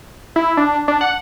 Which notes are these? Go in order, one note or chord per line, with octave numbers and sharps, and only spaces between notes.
E4
D4
D4
F#5